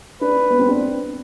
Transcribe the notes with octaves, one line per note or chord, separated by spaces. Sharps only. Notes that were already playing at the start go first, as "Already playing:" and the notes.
D4 B4
D4
B3
C4
D4